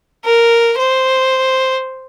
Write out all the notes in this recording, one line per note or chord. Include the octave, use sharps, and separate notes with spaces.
A#4
C5